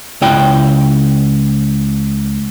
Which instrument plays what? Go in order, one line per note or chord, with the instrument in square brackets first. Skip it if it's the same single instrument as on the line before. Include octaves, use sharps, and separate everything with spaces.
[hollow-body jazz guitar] C#2 E4 C#5 F#5 G5